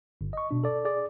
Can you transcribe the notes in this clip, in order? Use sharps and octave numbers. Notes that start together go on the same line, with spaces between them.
G1
D#5 C#6
B2 D4
A4 D5
G#4 D5